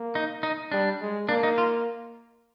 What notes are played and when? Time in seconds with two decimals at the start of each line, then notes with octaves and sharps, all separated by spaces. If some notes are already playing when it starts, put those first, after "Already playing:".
Already playing: A#3
0.15 D#4
0.43 D#4
0.72 G3 D4
1.01 G#3
1.28 A#3 D4
1.43 D#4
1.58 F4